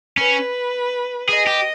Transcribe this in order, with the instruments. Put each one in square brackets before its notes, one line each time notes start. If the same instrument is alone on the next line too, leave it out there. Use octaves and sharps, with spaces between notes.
[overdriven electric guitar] C#4 [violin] B4
[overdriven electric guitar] G#4 [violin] D#5
[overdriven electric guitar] G4